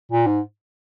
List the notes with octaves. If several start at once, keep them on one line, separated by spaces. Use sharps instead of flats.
A#2
G#2